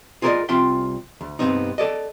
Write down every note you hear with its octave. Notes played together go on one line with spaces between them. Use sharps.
F4 G#4 A#4 C5 D5 D#5
C2 C4 F4 E5 G5 C6
D2
G2 C3 G3 B3 C4 D#4
A4 D5 D#5